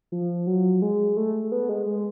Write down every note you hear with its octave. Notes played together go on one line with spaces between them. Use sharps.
F3
F#3
G#3
A3
B3
G#3
G#3